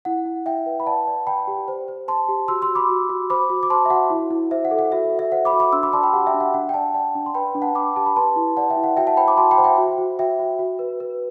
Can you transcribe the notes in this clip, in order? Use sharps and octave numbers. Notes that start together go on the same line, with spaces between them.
E4 F#5
E4
E4 E5 G5
B4
B5
D5 F#5 A5
D5
D5 G5 B5
G4
C5
C5
C5 A5 C6
G4
F#4 C6 E6
C6 E6
F#4
B5 D6
F#4
F#4
C5 B5 D6
F#4
D6
C5 A5 C6
E5
F#4 F#5
E4
E4
C5 E5
F#5
A4
F#5
F#4 E5
F#4
E5
C5 F#5
B5 D6
F#4
B5 D6
D4 C6 E6
B5 D6
D5 A5 C6
G5 B5
G4 F#5
E5 G5
D4
F#5
D4 F#5
G5
D5 F#5 A5
D5 F#5 A5
D4
C6
B4 G5 B5
D4
F#5 A5
D4 B5 D6
G4 A5
B5
B4 A5 C6
E4
D5 F#5 A5
E5 G5
E4
F#5
F#4 E5 G5
F#5 A5
C5 G5 B5
B5 D6
F#4 A5 C6
G5 B5
C5 F#5
E5 G5
F#4
F#4
F#4 E5 G5
F#4
F#4
B4
B4